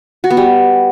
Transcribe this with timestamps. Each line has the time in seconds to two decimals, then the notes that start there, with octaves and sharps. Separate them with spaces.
0.24 F#4
0.30 B3
0.37 G3